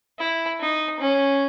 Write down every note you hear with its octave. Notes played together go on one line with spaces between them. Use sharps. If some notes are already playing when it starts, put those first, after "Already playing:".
E4
D#4
C#4